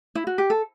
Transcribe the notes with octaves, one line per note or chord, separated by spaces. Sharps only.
E4
F#4
G4
A4